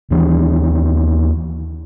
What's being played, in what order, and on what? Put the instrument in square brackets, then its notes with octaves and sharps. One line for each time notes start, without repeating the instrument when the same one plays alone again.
[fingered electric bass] D#2 E3 D4